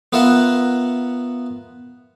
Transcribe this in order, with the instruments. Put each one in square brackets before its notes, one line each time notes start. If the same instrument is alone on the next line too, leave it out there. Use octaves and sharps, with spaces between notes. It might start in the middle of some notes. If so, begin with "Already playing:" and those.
[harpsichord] B3 F4 A#4 E5 F#5